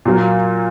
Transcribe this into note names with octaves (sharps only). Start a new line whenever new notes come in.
A#2 F#3 A#3